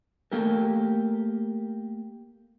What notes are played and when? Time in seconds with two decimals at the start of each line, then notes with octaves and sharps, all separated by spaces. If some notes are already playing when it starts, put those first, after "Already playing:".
0.32 A3 A#3 G4 A4 A#4